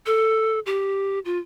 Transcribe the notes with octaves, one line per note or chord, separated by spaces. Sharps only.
A4
G4
F4